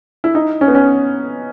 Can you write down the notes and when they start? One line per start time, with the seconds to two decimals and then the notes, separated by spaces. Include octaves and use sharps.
0.24 E4
0.35 D#4
0.61 C#4
0.68 B3
0.75 C#4